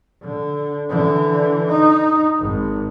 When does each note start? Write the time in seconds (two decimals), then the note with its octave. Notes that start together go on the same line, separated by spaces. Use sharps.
0.23 D3
0.90 D3 E3
1.69 D#4
2.39 G#1